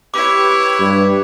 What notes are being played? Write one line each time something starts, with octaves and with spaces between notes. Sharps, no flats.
E4 G4 B4 C#5 D6
G2